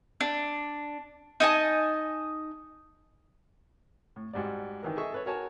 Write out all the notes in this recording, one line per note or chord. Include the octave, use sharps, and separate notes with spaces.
D4
D#4 D#5 G#5 A5
A2
G#2 G3 F#4 D5
D#3 E3 A#4
G#4 A4 D#5 E5 C#6
A4 B4 C#5
F#4 A#4 C#5 G#5 A5